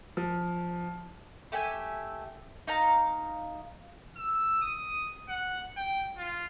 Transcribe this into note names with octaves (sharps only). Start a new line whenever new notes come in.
F3
A3 G4 E5 G#5
D#4 F5 A#5
E6
D#6
F#5
G5
F4